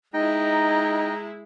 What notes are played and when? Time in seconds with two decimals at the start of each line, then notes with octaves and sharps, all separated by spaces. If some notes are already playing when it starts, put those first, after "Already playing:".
0.14 G#3 D#4 E4 D#5 G5 A#5